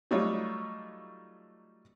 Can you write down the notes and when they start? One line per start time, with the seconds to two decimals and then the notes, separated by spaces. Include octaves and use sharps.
0.11 F#3 G3 A3 D#4 F4 C#5